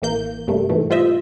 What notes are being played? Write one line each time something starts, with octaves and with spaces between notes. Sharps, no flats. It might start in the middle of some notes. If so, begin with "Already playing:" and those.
A1 E3 A#3 G6
G2 C3 G3 A3 A#3
G#2 B2 E3 A3
G3 F4 C5 D#5 E5